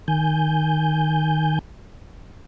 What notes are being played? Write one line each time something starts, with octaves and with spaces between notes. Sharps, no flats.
D#3 G#5 G6